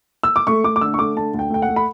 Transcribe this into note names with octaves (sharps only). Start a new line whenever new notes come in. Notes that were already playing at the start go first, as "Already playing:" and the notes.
E6
D6
A3 C#6
A3 D6
D6
D3 E6
C#6
A3 D6
D3 A5
D2
G5
A3 G5
F#5
A3
B5